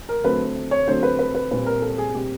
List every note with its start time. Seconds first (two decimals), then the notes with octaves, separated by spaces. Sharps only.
0.09 A#4
0.24 D3 F#3 A3 C4 B4
0.71 C#5
0.88 D3 F#3 A3 C4 C5
1.03 B4
1.19 B4
1.35 B4
1.51 A#2 G3 C4 B4
1.66 A#4
1.82 A4
1.98 G#4
2.14 A#2 G3 C4 G4